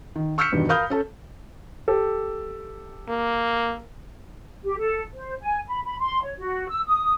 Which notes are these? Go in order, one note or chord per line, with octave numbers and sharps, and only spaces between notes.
D#3
C#6 E6 F6 G6 B6 C#7
E2 G2 B2 D#3
A#4 F5 B5 D#6 F6 G6
C#4 A4 A5
G4 A4
A#3
G4
A4
C5
G#5
B5
B5
C6
C#5
F#4
E6
D#6